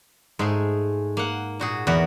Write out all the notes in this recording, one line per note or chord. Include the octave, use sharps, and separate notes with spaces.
G#2 G#3 A3 G#4
A#3 F#5
A#2 F#4 G#4
E2 B3 F#4 A#4